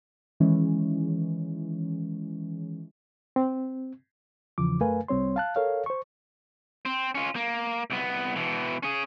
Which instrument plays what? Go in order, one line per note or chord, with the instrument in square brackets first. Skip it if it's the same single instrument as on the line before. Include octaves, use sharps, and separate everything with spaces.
[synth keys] D#3 E3 G#3 C#4
[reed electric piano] C4
E2 C#3 E3 F3 D6
F#2 A3 A#4 B4 F5 G#5
C2 G3 C4 C#5 C6
F5 A5 F#6
A4 A#4 C#5 F5
C5 C#6
[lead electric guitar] C4
C#4 F4
A#3
C2 B3
B2 E3
C#4 G#4